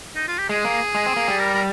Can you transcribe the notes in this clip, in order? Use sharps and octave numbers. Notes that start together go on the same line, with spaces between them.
D#4
F4
G4
G#3 G#4
A#3
G#3
C4
A#3
G3
A#4
A#4